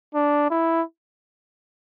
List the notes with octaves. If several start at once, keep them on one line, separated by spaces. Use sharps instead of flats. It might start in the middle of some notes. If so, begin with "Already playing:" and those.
D4
E4